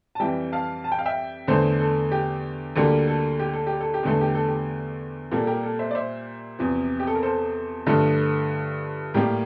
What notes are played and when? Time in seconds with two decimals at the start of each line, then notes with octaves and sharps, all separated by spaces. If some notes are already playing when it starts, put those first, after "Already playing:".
0.15 A5
0.20 F2 E3 G3 E5 G5
0.52 F5 A5
0.84 A5
0.92 G5
0.99 F5
1.06 E5 G5
1.48 E2 D3 A3 A4 C5
1.80 A4
2.12 G4
2.76 D2 D3 G3 A#3 A4
3.08 A4
3.39 G4
3.53 A4
3.67 G4
3.80 A4
3.94 G4
4.03 E2 D3 A3 A4
4.21 G4
4.35 A4
4.48 G4
5.31 A#2 G3 A#3 A4
5.47 G4 A#4
5.63 A4
5.79 C5 E5
5.91 D5
5.95 C5 E5
6.59 E2 C3 F3
6.99 G4
7.07 A4
7.15 A#4
7.23 A4 C5
7.86 G2 D3 F3 A3 A4
9.14 A2 G3 A#3 G4 A#4